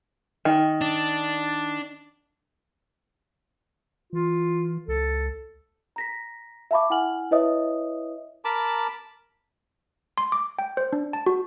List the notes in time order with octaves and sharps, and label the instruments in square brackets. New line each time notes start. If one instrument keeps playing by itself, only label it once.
[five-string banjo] D#3
[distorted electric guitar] D4
[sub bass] E3 [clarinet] F4
[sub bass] C#2 [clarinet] A4
[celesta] A#5 A#6 B6
E5 F5 A5 B5 C#6 D6
E4 F#5 G#5 F6 F#7
E4 B4 C#5 D#5 E5 D#6
[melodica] A#4 A5 B5 D6
[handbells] C6
D6
G5
C5
D4
A5
F#4